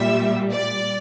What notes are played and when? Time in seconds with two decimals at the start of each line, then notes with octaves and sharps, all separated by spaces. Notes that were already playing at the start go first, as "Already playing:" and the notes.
Already playing: A#2 G3 E5
0.52 D5